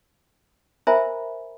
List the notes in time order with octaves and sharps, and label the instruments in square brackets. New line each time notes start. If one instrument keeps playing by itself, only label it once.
[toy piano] A#4 C5 E5 G#5 A#5 B5